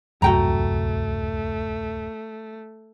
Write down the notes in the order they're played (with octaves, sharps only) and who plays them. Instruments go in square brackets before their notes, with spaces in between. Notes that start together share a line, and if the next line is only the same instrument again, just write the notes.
[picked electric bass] D1 C2 F#2 [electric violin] A3 [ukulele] F#4 G5 A#5